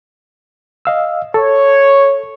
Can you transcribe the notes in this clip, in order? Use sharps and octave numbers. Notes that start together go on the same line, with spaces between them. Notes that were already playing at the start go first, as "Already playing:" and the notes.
D#5 F5 E6
A4 C#5